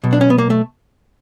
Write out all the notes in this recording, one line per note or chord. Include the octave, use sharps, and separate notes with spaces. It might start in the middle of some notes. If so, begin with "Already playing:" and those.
B2 F#3
D4
C#4
B3
A#3
A3